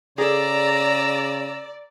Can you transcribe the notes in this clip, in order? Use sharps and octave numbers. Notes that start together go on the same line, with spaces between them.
C#3 G#4 A4 D5 A#5 E6